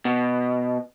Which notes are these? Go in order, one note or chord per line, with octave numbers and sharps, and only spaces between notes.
B2